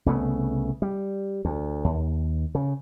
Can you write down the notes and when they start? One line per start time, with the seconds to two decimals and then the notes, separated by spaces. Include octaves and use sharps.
0.06 C2 C#3 A3 B3
0.82 G3
1.45 D2
1.84 D#2
2.55 C#3